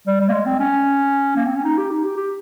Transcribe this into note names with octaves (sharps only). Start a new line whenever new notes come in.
G3
G3
A#3
G#3
C4
C#4
A#3
C4
C#4
D#4
G4
D#4
G4
G4